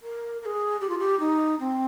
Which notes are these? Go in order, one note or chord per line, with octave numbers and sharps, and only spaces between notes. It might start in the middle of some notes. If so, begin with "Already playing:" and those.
A#4
A#4
G#4
G4
F4
G4
D#4
C4